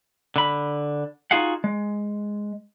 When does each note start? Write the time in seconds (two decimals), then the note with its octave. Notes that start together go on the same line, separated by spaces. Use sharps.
0.36 D3 B5
1.31 D#4 F4 F#4 G#4 F5 F#5
1.64 G#3